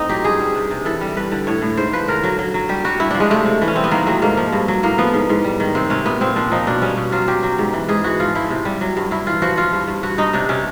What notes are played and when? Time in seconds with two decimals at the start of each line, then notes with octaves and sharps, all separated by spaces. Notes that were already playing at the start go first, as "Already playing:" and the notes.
Already playing: A2 C4 D#4
0.09 F#3 G4
0.24 G2 G#4
0.40 G3
0.55 C3
0.71 C3
0.85 E3 A4
1.01 G3
1.17 G2 B4
1.31 D3
1.47 A2 C#5
1.62 A2
1.77 G#2 C5
1.93 F3 B4
2.08 D3 A#4
2.23 F#3
2.39 F#3
2.54 F#3
2.69 G3 G4
2.85 G3 F#4
3.00 G2 E4
3.11 F3 D4
3.20 G#3
3.30 C3 A3
3.46 C3
3.62 E3
3.68 C#4
3.76 G3 C4
3.84 B3
3.91 D#3 A#3
4.07 F#3 A3
4.22 G#2 A#3
4.37 F3
4.52 G2
4.68 F#3
4.83 A2 A#3
4.98 F3 B3
5.14 G#2
5.29 G#2
5.44 G3
5.60 D#3
5.75 C3 C4
5.90 C3 C#4
6.05 A#2 B3
6.21 A#2 C4
6.36 F3 D4
6.52 F3 D#4
6.67 B2 D4
6.82 G3 C#4
6.97 B2
7.12 F#3 F4
7.28 F#3 G4
7.43 F#3
7.58 G#2
7.73 E3
7.89 G#2 G#4
8.04 E3 F#4
8.20 F3 F4
8.35 F3 E4
8.50 C3
8.65 G3
8.81 F#3
8.97 G2
9.11 G2 E4
9.27 E3 F4
9.42 F3 F#4
9.57 F3 F4
9.73 G2
9.88 G2
10.03 G2 F#4
10.18 G2 D#4
10.33 C3 D4
10.49 C3 C#4